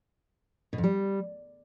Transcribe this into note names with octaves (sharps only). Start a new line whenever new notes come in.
B2
F2
G3